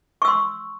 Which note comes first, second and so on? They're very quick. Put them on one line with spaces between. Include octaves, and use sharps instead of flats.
C#6 E6 C6